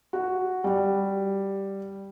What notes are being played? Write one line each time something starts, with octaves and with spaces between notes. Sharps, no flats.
F#4
G3